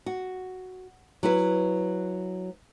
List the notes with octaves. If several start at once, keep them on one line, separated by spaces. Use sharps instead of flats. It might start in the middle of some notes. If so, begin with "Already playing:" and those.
F#4
F#3 E4 B4